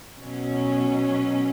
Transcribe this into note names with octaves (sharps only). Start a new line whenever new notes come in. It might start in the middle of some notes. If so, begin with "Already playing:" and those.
B2 F#3 C#4